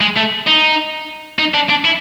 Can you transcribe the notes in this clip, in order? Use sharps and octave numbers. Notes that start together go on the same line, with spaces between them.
G#3
A3
D#4
D#4
D4
D4
E4